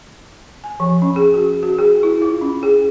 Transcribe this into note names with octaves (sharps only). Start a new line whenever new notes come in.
G#5
F3
C#4
G#4
F#4
F#4
G#4
E4
F4
C#4
G#4